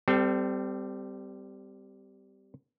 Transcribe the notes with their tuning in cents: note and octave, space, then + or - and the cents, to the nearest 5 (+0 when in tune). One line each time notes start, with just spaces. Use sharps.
G3 +0 C4 -30 A4 +10